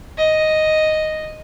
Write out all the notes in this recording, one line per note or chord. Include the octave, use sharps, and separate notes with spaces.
D#5